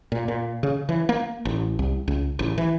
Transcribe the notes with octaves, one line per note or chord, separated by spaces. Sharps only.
A#2
A#2
C#3
E3
A#3
A1
C2
C#2
A1
E3